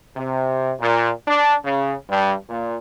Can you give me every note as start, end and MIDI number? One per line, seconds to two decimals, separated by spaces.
0.15 0.73 48
0.79 1.09 46
1.27 1.54 62
1.64 1.94 49
2.09 2.33 43
2.48 2.76 46